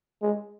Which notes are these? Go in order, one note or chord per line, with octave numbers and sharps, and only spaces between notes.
G#3